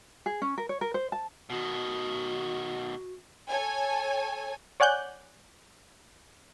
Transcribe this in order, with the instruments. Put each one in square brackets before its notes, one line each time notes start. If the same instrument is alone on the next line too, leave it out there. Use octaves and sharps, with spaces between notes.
[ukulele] G#4
C#4
A#4
C#5
A#4
C5
A5
[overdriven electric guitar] B2 D#3 [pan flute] F#4
[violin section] A4 C#5 G#5
[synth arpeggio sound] C#5 D5 F#5 G#5 F#6 G6